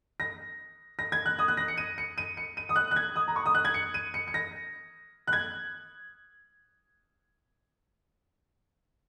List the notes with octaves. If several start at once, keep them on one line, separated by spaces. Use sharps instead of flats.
A#6
A#6
G#6
F#6
D#6
F#6
A#6
C#7
D#7
C#7
D#7
C#7
D#7
D#6
F#6
F#6
G#6
D#6
A#5
C#6
D#6
F#6
G#6
C#7
D#7
C#7
C#7
A#6
F#6
G#6